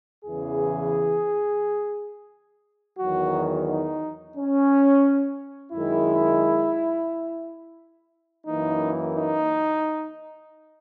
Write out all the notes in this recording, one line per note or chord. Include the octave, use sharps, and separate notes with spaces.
E2 C#3 E3 G#4
E2 D#3 F#3 F#4
D#4
C#4
F#2 D#3 G#3 E4
F#2 E3 A#3 D#4
D#4